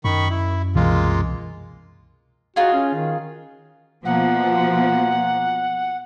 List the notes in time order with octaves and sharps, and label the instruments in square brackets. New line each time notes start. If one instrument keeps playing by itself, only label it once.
[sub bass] F#2 [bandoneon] D#3 B5 C#6
[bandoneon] E4
[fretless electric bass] C2 B2 E3 [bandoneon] G#3 A#3 F4
[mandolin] D#4 F4 G#4 [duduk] F#4
[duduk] C#4
D#3
[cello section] B2 F3 [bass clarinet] A#3 [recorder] F#5